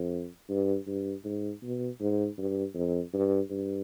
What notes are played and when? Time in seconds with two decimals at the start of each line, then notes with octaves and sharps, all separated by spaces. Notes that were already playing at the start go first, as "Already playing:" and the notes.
Already playing: F2
0.49 G2
0.87 G2
1.24 G#2
1.63 B2
2.00 G#2
2.38 G2
2.74 F2
3.13 G2
3.50 G2